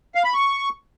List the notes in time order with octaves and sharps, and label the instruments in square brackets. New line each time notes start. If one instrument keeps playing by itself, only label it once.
[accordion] F5
B5
C#6